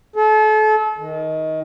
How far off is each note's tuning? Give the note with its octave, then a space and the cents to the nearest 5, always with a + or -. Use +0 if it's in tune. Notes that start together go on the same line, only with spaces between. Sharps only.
A4 -35
D#3 +20